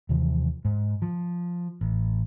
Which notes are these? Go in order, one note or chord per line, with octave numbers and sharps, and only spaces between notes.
D#2 C3 E3 F3
G#2
F3
A1